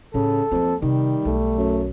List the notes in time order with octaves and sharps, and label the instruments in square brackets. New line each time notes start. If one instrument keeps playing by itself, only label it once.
[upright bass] A2 [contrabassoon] C#3 [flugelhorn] A4
[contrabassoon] F2 [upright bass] A3 A#3
[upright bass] C3 [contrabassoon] D#3 [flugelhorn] G3
[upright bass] B1 [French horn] A3
[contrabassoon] F#2